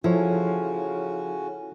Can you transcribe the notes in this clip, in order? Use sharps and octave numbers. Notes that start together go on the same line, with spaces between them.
C#3 F3 C#4 E4 F#4 A4 C#5